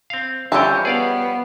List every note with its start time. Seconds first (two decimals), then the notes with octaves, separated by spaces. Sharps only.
0.10 C4 F5
0.52 D3 E3 F3 G3 C#4 E5 G5 A5
0.85 B3 G#4 D5 F5